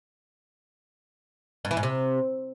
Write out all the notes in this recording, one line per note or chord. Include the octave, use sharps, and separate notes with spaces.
G2
E3
G#2
C3